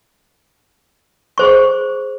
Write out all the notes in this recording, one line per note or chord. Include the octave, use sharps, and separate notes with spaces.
G#4 C5 C#6